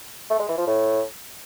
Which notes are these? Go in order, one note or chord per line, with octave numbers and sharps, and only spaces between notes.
A3
G#3
E3
F3
A2